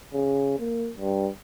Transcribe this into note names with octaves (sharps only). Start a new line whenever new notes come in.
C#3
A#3
G2